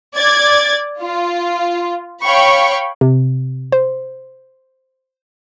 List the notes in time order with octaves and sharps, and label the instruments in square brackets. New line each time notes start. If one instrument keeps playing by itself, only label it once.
[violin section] D5 G#6 A6
F4
C#5 F5 G5 B5 C#6
[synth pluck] C3
C5